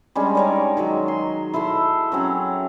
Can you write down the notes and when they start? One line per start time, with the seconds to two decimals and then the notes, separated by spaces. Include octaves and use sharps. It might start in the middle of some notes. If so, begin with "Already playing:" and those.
0.15 G3 G#3 C#4 D4
0.35 D#4 C#5 D5
0.77 D#3 F#3 G#3
1.08 C6
1.54 E4 A4 F#5 C6
2.12 F#3 C4 C#4